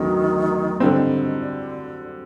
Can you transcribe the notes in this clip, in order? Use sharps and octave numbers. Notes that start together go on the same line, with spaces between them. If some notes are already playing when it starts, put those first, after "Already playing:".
Already playing: D2 D3 D#3 F#3 B3
D3 D#3 G3 C4
D3